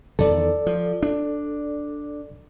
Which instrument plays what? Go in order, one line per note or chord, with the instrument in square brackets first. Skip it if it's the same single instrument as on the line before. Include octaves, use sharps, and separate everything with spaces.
[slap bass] E2 D#3 [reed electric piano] A4 D5
[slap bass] F3
D4